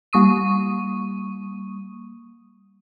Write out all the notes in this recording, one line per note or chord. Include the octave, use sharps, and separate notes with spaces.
G3 A#3 C#6 D#6 D#7